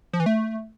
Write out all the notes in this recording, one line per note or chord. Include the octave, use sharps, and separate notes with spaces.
F3
E3
A3